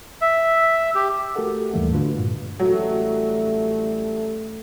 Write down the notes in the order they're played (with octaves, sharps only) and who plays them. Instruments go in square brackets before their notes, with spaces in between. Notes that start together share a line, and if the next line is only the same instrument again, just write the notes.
[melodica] E5
G4
[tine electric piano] A3 F#4 G4 A4 A#4 F#5
D#2 G#2 E3 G3 A3 A#3
D3 D4 F4 F#4 B4
G2 A#2
[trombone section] A1 G3 A3 [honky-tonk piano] F#3